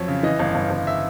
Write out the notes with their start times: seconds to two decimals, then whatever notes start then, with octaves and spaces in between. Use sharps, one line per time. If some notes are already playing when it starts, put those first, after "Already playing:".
Already playing: F2 F#3 C#5
0.08 C#3
0.23 E3 D#5
0.39 G1
0.55 G1
0.71 G1
0.87 E5